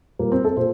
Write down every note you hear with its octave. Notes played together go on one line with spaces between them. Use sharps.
A#2 G3 A#3
C4
A4
A#2 C5